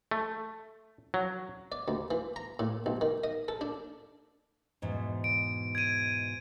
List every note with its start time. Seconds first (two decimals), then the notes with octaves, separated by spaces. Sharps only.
0.11 A3
1.14 F#3
1.72 D5
1.88 D2
2.11 E3
2.36 A#5
2.59 A2
2.86 B1
3.01 D#3
3.24 D#5
3.48 A4
3.61 D4
4.82 E2 G#2 B2
5.24 D7
5.75 G#6 D#7